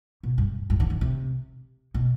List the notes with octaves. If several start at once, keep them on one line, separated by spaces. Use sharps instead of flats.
B2
G2
G2
D3
D#3
C3
B2